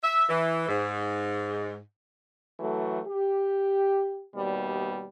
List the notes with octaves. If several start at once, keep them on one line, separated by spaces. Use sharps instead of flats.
E5
E3
G#2
E3 F#3 A3
G4
D#2 B2 G3